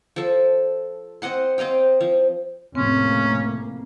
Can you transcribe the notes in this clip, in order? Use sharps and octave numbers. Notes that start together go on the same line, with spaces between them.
F3 A4
C4 D#5 F#5 C6
C4 D#5 F5 G5
F3
F1 A2 A#3 C4 C#4